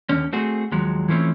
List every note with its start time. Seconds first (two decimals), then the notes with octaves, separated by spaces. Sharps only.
0.09 D#2 D3 C#4
0.33 A3 C4 F#4 G#4
0.72 D#2 F3 F#3 G#3
1.08 E3 F3 A3 C4 C#4